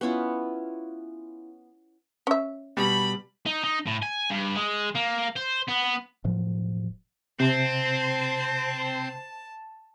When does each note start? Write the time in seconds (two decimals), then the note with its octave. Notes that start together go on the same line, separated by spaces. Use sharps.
0.01 B3 C#4 E4 F4
2.27 C#4 E5
2.77 B2 G3 B5
3.46 D#4
3.64 D#4
3.86 A2
4.02 G#5
4.30 G2
4.55 G#3
4.95 A#3
5.36 C5
5.68 B3
6.24 E1 A2 F3 F#3
7.40 C3 C4 C5 A5